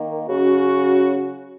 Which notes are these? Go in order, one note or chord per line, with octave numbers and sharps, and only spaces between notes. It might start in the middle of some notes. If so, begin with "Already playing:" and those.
Already playing: D#3 A#3
C#3 F#3 C#4 F#4